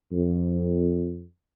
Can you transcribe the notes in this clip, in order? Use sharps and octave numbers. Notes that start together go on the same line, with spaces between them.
F2